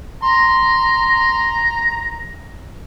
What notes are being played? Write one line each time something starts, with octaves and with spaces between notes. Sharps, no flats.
A#5 C6